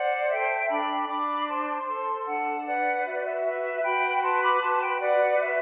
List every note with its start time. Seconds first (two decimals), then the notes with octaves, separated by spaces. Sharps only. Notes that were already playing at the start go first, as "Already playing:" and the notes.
Already playing: C5 D5 F#5
0.31 A4 E5 G5
0.69 D4 G5 B5
1.09 D4 B5 D6
1.47 C5 A5 C6
1.88 A4 A5 C6
2.26 D4 F#5 A5
2.65 B4 D5 F#5
3.05 F#4 E5
3.15 D5
3.25 E5
3.44 B4 E5
3.83 F#4 G5 B5
4.23 B4 A5 C6
4.42 B5 D6
4.61 F#4 A5 C6
4.81 G5 B5
5.01 B4 D5 F#5
5.40 F#4 E5